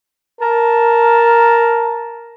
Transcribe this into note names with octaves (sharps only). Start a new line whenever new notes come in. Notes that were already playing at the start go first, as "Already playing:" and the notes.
A#4 A5